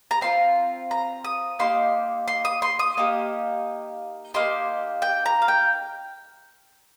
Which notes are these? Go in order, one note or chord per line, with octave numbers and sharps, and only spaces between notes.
A#5
C4 F4 C6
A#5
D#6
A#3 D#4 G4 C6
C6
D#6
C6
D#6
A#3 D#4 G4
A#3 D#4 G4 C6
G5
A#5
F5
G5